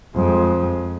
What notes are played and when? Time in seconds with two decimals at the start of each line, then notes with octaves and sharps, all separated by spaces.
0.16 F2 G#3